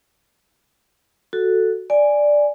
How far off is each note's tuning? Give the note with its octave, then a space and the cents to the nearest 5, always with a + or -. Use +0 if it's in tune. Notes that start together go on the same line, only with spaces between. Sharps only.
F#4 +0 A4 +0
D5 +0 G#5 -5